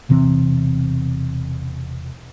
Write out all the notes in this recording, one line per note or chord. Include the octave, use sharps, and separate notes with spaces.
E1 C3 E3 C4